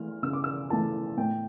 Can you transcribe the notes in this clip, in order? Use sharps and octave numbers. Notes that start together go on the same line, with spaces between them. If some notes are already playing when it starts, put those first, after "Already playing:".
Already playing: E3 A3 F6
C#3 E6
D6
E6
E3 A3 A5
A2 G5